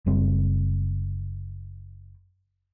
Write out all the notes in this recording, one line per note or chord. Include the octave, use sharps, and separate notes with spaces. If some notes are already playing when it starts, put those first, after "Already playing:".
F#1 G3 C4